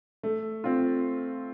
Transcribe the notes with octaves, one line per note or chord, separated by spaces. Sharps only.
A3
C4 F4